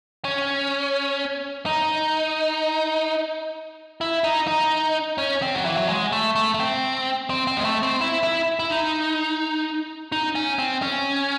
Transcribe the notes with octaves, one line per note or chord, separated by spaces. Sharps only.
C#4
D#4
E4
D#4
D#4
C#4
C4
F#3
E3
F#3
G#3
A3
A3
A3
C4
C4
C4
G#3
A3
C4
E4
E4
E4
D#4
D#4
C#4
C4
C#4